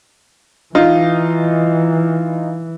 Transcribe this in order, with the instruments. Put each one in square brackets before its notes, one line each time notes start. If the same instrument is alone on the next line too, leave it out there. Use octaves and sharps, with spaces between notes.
[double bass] E3 [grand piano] D#4 F4